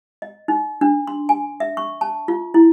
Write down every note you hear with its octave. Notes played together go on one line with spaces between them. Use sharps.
D#5
D#4
D4
C6
G#5
E5
C#6
A5
F4
E4